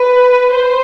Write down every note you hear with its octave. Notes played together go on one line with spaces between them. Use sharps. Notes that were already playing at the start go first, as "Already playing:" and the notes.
Already playing: B4
C5